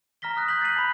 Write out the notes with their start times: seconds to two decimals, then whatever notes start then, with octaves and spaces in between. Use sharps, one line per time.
0.22 A#5 F6 A#6 B6 G7
0.37 D#6 F#6 A#6
0.48 G6 A#6 B6 F#7
0.62 A6 B6 C7 D#7 F#7
0.76 A5 B5 F#7